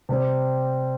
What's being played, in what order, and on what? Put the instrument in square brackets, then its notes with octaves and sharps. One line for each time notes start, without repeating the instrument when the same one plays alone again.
[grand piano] C3 G3 C4